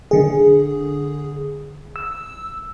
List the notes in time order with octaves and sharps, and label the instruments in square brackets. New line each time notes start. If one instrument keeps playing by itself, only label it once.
[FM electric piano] D3 G#4
E6